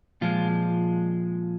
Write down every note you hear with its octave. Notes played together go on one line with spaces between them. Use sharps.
A#2 F3 G#3 F4